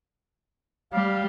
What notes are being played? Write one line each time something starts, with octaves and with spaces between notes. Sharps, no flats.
G3 F5